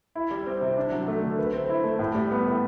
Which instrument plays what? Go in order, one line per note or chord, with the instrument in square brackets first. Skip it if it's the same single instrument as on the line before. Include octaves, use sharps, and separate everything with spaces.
[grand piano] E4
G3
C4
C3
D4
F#3
A3
D3
B4
C4
E4
A3
A2
G3
B3
A2